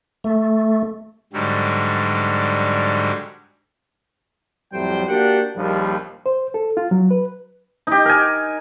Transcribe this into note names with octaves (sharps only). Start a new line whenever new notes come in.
A3
G#2 D3 F#3 G3
F2 A2 F#3 G3 C5 G5
A#3 D4 F#4 G4 F#5 G5
A#1 D#2 F3 G3
C5
A4
F4
F#3
B4
D#4 G4
A#4 G#5